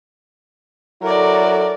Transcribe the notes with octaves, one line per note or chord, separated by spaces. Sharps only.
F#3 E4 A4 A#4 D5